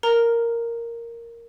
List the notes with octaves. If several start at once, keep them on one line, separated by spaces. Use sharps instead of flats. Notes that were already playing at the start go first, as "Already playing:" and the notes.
A#4 A#5